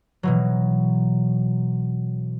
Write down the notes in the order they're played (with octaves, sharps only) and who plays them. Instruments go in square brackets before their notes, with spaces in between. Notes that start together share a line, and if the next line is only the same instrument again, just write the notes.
[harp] B2 E3 F#3